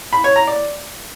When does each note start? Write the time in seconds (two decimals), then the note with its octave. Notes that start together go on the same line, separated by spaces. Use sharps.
0.13 B5
0.24 C#5
0.36 A#5
0.47 D5